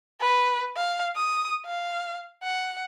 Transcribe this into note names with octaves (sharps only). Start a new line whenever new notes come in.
B4
F5
D#6
F5
F#5